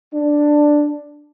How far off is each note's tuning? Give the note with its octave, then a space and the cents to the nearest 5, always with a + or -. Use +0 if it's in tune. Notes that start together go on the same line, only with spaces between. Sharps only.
D4 +5